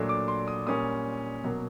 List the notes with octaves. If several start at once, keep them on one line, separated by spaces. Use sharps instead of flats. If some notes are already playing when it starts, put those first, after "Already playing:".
Already playing: A#2 F#3 A3 D4
D6
C6
D#6
A#2 G3 A#3 C#4 D#6
B2 F#3 A#3